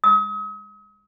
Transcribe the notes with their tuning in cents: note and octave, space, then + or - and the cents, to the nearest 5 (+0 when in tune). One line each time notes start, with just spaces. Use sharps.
D#6 +40